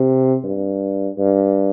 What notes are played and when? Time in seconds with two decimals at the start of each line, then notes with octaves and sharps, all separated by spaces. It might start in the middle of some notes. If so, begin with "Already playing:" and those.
Already playing: C3
0.44 G2
1.18 G2